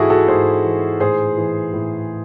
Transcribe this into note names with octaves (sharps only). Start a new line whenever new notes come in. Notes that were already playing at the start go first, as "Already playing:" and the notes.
Already playing: G#2 E3 E4 F#4 G#4 A4
F#4 A4
G#2 G#4 C5
E3
A2 G#4 C5
E3
A2